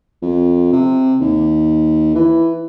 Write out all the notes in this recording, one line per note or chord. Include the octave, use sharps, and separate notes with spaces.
F2
C3
D#2
E3